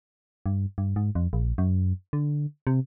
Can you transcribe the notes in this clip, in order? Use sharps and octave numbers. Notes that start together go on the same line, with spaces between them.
G2
G2
G#2
F2
A#1
F#2
D3
C3